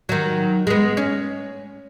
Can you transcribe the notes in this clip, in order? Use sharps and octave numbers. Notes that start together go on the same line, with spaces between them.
D#3 F#3
G#3 B3
C#4